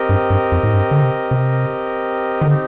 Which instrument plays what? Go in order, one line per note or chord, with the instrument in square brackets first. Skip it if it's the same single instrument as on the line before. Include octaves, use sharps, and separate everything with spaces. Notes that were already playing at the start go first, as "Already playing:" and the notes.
Already playing: [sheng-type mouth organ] C4 G4 A#4 D#5
[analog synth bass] G2
G2
F2
A2
G2
D3
C3
C3
D#3
[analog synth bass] D3 [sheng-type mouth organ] C4 D#4 G4